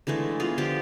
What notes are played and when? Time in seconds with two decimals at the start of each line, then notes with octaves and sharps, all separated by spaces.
0.07 D3 E3 G#3 A3
0.40 B3 F4 G#4
0.58 D3 F3 F4 G4